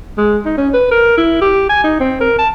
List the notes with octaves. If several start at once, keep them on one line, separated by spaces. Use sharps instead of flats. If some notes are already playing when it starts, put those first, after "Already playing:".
G#3
D#4
C#4
B4
A#4
E4
G4
G#5
D#4
C4
A#4
A5